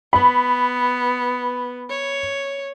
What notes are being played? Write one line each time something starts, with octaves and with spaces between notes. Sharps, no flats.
B3 B5
C#5